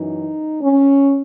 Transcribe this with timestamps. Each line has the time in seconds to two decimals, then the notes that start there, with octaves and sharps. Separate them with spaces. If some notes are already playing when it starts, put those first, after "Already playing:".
Already playing: F#2 E3 D#4
0.61 C#4